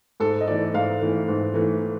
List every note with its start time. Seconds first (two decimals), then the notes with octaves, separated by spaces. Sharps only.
0.20 G#2 A4
0.41 D#5
0.48 E3 A3 D5
0.74 G#2 F5
1.01 E3 A3
1.28 G#2
1.54 E3 A3